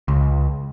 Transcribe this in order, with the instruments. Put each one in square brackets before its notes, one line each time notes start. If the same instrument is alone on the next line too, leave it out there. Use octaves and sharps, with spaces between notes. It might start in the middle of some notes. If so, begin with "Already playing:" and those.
[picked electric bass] C#2